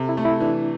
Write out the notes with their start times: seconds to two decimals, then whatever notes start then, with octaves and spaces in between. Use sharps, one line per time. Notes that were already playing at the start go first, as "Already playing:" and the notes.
Already playing: C3 A4
0.09 E4
0.17 A3
0.25 E4
0.40 E3 D4